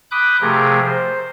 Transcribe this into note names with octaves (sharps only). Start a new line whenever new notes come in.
B5 D6 D#6 F#6 G6
C3 F3 A3 G4 G#4 A#4
C5